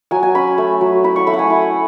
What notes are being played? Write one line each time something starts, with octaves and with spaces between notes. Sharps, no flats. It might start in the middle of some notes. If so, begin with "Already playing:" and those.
F#3 G#5
G#5
C#4 B5
A3
F#3
E4 B5
C#6
A3 B5
F#5
G#5
E4